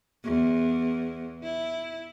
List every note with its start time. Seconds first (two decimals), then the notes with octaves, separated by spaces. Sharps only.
0.24 E2
1.43 E4